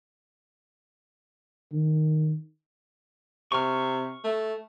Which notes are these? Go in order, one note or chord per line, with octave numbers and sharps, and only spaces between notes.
D#3
C3 C#6 F6
A3